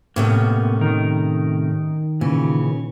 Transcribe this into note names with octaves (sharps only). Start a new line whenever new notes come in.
A2 C3 A#3 B3 C#4
D#3 D#4 A#4
A#2 C#3 E3 C#4